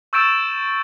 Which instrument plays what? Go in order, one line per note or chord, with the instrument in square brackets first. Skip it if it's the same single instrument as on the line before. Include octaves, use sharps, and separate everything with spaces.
[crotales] C#6 E6 G6 A6 D7 E7